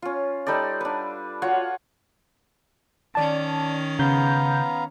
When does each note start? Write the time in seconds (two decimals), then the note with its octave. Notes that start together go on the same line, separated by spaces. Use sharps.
0.02 C#4 F4
0.46 G3 D#4 A4 D5
0.81 D4 B4
1.42 F4 F#4 C#5 F#5
3.15 D#3 C#4 D5 A5
3.99 C#3 B3 F5 A#5 G6